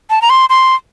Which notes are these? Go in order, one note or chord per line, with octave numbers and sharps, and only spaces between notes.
A5
A#5
C6
C6